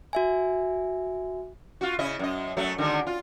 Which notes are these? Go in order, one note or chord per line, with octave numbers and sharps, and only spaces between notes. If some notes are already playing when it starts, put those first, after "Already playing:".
F#4 E5 G#5
F4 F#4
C#3 E4 D#5
F#2 D#5
F#2 F#3 A3
D3 D#3 G#3
F4